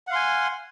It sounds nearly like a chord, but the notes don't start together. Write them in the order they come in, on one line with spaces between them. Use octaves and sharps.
F#5 F5 C6 G#5